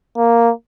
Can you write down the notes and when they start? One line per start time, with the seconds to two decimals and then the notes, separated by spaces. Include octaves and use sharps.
0.17 A#3